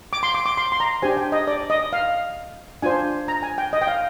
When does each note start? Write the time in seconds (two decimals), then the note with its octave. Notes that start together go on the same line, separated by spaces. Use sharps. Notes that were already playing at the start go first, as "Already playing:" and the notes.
0.13 D6
0.23 C6
0.35 D6
0.46 D6
0.58 C6
0.72 C6
0.80 A#5
1.02 D4 G4 C5 G#5
1.17 G5
1.32 D#5
1.47 D5
1.70 D#5
1.93 F5
2.82 D4 F4 C5 G#5
3.28 A#5
3.43 G#5
3.58 G5
3.73 D#5
3.82 G5
3.87 F5